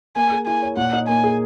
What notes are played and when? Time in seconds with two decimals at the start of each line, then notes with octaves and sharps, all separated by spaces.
0.16 A#3 G#5
0.32 G#4
0.46 E4 G#5
0.62 C#5
0.77 A#2 F#5
0.93 D#4
1.08 A#3 G#5
1.24 G#4